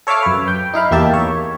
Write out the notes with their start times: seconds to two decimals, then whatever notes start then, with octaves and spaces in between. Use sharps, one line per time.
0.07 A4 C#5 E5 F5 D6 F6
0.23 F#2 B4
0.48 G5
0.74 D#4 E4 F5 B5
0.91 E2 A#3 D#4 G4 E5 A5
1.14 C#5